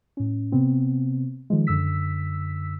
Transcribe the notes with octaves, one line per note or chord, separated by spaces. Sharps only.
A2 C#4
C3 B3 C4
D#3 F3 G#3
F#2 D3 E6 B6